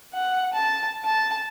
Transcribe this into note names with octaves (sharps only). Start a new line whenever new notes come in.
F#5
A5
A5